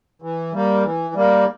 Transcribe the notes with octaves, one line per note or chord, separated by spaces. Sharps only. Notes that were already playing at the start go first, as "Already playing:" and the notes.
E3
G3 A#3
E3
G3 A#3